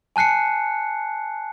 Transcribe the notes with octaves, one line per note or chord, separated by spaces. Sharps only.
G#5 A5 F#6 C7 C#7